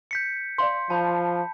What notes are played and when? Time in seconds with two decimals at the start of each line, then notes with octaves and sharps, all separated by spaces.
0.11 G6 B6 C#7
0.58 D5 F5 C6
0.90 F3 A5 B5 G6